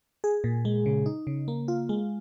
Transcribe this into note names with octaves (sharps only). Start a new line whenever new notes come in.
G#4
A#2
G#3
C#3
D#4
C#3
A#3
F4
G#3